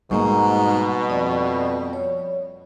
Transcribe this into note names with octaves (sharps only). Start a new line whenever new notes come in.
G#2 B2 G3 G#3 A#3 A#5 C#6
F2 D5
C#5